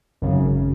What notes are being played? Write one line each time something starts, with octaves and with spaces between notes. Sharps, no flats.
G#1 F#2 C#3